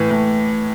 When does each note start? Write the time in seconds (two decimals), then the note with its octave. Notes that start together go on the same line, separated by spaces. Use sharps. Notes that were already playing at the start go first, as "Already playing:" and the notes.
Already playing: A2 E3
0.11 A2